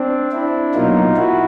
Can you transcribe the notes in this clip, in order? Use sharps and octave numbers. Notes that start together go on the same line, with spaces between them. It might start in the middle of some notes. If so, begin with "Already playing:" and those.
Already playing: C4 D4
D4 E4
B2 F#3 A#3 D#4 F4
E4 F#4